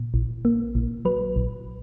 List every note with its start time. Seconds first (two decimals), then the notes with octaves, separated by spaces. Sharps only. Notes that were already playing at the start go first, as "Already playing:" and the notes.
Already playing: A#2
0.14 A#1
0.45 A#3
0.75 A#1
1.05 F#3 B4
1.36 A#1